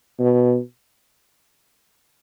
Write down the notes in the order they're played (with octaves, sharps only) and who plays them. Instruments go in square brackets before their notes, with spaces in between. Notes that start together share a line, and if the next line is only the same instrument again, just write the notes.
[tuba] B2